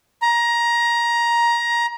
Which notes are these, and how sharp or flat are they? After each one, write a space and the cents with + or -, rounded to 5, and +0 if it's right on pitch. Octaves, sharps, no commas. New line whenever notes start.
A#5 +15